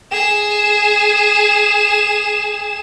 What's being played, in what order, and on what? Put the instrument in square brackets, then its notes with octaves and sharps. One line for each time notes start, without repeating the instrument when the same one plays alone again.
[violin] G#4 E7